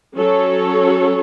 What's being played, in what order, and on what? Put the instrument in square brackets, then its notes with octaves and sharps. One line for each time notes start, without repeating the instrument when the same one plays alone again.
[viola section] F#3 C#4 A4 C#5